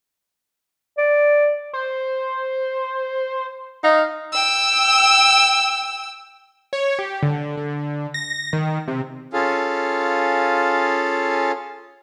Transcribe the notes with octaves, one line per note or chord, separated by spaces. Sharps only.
D5
C5
D#4 F5
G5 E6
C#5
G4
D3
D3
A#6
D#3
C3
C#4 F4 G#4 A4 F5